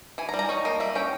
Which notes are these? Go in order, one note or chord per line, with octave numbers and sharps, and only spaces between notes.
E3 G#5
A#5
G3
A#5
D#4 C#5
A#3 D#5
G3 E5
C#4 G5